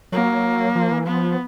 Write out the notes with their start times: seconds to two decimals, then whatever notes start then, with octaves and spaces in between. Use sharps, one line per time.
0.12 F#3 A#3
0.75 F3
0.92 E3
1.07 F3 B3